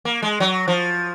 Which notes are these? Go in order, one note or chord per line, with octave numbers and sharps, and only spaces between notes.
A#3
G#3
F#3
F3